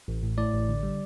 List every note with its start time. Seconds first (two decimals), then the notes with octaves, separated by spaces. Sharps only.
0.08 A1
0.23 A2
0.38 A2 D5
0.53 A1
0.69 D3
0.83 G3